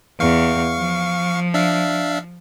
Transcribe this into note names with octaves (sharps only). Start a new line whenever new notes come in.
E2 F5 C#6
F3
D4 E5 F5